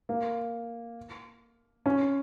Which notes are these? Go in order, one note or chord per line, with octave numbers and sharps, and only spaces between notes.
A#3
C#4